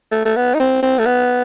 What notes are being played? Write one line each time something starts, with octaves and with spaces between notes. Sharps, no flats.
A3
A3
B3
D#4
C4
C4
A3
B3